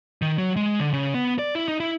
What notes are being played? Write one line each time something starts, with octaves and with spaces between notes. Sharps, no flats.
D#3
F#3
G#3
D3
C#3
B3
D5
E4
D#4
E4